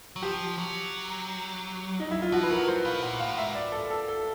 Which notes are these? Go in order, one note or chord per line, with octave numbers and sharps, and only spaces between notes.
F#3
F3 G4
F#3
D#4
E4
F4
F3 F#4
B4
F#3 A#4
C5
B2 F5
A#2 F#5
A2 F5
G#2 E5
D5
A4
A4
A4